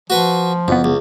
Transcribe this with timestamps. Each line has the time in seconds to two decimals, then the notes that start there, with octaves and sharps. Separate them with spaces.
0.10 F3 F#4 B4 C#6
0.68 F#1 F2 B3
0.84 C#2